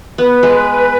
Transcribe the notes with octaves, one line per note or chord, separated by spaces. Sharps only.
B3 B4
G#3